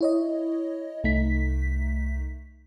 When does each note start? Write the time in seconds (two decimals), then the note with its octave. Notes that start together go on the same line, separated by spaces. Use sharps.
0.01 E4 C#5 D#5
1.04 C2 A3 D#4 B6